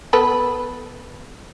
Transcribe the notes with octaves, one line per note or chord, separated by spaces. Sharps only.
B3 A4 B4